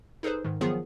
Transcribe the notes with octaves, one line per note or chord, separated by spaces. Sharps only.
D#4 G#4 A4 B4 C5
G#2 D#3
D#3 F3 F#3 B3 F4 G#4